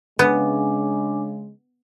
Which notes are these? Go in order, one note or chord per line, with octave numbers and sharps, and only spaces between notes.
C#3 G#3 B3 D4 G#5 D6